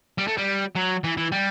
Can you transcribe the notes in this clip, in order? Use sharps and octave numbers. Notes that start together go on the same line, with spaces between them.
G3
A3
G3
F#3
E3
E3
G3